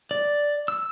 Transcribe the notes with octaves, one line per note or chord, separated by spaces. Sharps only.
D5
E6